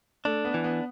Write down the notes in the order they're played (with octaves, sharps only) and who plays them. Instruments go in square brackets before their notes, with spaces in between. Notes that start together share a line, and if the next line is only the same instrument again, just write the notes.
[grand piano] A3 [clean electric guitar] D4
[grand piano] B3
[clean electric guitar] E3
[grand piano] B3